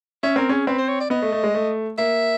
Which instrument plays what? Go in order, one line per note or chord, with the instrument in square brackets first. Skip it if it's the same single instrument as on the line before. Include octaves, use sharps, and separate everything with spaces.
[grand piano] C#4 [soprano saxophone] E5
[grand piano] C4 [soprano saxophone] A#4
[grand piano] C#4 [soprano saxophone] G#4
[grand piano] C4 [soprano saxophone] B4
[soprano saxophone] C5
C#5
D5
[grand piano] B3 [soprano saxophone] D#5
[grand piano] A3
A3
G#3
A3
[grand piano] A#3 [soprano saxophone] E5